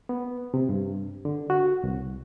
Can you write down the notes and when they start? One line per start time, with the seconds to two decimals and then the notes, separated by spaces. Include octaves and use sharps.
0.09 B3
0.54 C3
0.69 G2
1.25 D3
1.50 F#4
1.84 C2